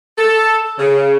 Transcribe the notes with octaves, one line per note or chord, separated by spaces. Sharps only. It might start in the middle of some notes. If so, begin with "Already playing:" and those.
A4
C#3